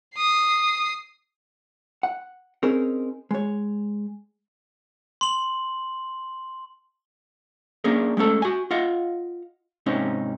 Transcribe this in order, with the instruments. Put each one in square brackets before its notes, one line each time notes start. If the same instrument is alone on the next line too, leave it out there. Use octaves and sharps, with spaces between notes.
[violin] D#6 C7
[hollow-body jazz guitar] F#5
C4 C#4 D#4 G#4 A#4
G#3 C#5
[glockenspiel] C6 F#7
[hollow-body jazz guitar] A#3 C#4 D4 G#4 A#4
G#3 A3 C#4 A4
F#4 G#5
F4 D#5 F5 F#5
G#2 C3 C#4 D#4